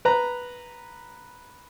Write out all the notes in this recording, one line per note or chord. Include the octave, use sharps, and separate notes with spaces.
B4 A#5